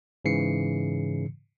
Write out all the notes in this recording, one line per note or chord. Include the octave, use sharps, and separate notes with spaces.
G#2 C#3 E3 C7 C#7